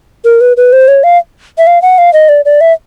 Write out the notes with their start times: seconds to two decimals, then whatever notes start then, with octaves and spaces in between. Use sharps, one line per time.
0.25 A#4
0.41 B4
0.57 B4
0.73 C5
0.88 C#5
1.04 F5
1.58 E5
1.67 F5
1.82 F#5
1.98 F5
2.13 D#5
2.29 D5
2.45 D5
2.61 E5